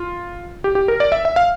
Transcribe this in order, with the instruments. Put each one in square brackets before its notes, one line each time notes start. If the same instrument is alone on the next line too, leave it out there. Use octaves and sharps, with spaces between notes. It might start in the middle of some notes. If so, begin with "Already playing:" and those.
Already playing: [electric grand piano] F4
G4
G4
A#4
D5
E5
E5
F5